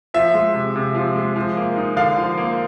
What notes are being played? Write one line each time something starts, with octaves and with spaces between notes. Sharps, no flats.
F3 E5
G#3
C3
C3
F3
G#3
F3
A#3
D#4
D3 F5
F3
A#3